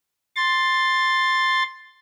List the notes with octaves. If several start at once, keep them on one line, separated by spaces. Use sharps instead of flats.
C6 A6